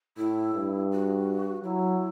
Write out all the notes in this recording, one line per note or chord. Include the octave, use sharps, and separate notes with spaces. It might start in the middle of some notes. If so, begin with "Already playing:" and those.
A2 E4
G2
F#4
F#3 E4